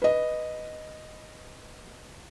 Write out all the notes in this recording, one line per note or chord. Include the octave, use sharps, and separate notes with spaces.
B4 D#5